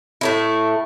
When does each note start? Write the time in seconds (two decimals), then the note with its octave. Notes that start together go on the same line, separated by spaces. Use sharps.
0.21 A2 A3 E4